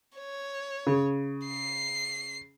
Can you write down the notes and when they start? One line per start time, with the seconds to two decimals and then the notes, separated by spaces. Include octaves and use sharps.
0.16 C#5
0.87 C#3
1.47 C7